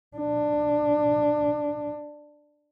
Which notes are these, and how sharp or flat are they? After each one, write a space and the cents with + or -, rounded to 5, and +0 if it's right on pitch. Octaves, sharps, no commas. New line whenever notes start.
D4 +10